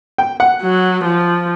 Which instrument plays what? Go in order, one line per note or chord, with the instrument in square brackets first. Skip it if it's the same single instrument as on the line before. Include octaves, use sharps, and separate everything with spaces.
[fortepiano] G5
F#5
[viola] F#3
F3